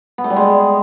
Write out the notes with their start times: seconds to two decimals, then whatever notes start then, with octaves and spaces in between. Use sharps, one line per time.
0.18 B3
0.24 A3
0.30 G3
0.36 G#3